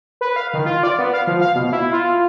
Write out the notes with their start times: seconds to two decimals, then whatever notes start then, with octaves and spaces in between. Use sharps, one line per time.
0.21 B4
0.36 F5
0.53 D#3
0.66 F4
0.83 D5
0.98 B3
1.13 F5
1.27 F3
1.41 F5
1.55 B2
1.73 E4
1.93 F4